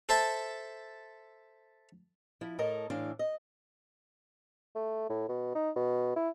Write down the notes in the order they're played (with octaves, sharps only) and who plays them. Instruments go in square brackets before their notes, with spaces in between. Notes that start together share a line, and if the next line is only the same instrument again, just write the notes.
[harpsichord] A4 C5 E5 A5
[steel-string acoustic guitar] F3 E4
A2 A4 A#4 D#5
A2 E3 D4 F5
D#5
[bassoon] A3
A2
B2
D#4
B2
E4